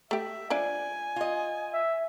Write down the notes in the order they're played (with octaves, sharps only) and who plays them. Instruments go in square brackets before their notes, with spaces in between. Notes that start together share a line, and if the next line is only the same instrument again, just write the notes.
[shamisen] A3 G4 [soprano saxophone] E5
[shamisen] F3 D4 D5 [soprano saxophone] G#5
[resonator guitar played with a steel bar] F4 D#5
[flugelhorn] E5